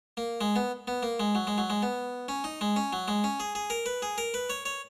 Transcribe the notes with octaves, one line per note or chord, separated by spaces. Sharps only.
A#3
G#3
B3
B3
A#3
G#3
F#3
G#3
F#3
G#3
B3
C#4
D#4
G#3
C#4
F#3
G#3
C#4
G#4
G#4
A#4
B4
G#4
A#4
B4
C#5
C#5